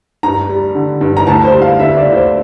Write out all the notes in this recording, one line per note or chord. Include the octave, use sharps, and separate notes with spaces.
G2 A#5
G3
D3
G2
A#5
D2 A5
C5
G3
F5
D3 E5
D5
D2
C5